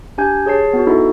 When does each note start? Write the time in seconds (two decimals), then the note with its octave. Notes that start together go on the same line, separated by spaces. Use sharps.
0.18 D4 G4 G#5 G6 G#6
0.46 G#4 C#5 A5 C7
0.73 B3 F#4
0.87 D#4 E4 F#4 A4